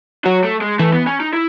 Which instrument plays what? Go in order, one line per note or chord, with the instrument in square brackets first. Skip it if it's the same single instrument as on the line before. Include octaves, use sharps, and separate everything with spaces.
[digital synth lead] F#3 [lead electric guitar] F#4
[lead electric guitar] A3
G#3
[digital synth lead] E3 [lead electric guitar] A3
[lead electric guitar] B3
C#4
D#4
E4